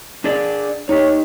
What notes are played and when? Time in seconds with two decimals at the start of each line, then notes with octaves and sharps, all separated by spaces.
0.24 D4 G#4 D5
0.89 D#4 G4 C#5